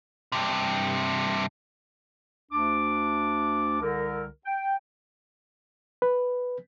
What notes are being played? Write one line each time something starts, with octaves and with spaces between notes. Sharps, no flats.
G2 C3
D2 D4 D6
C2 D3 A#4
G5
B4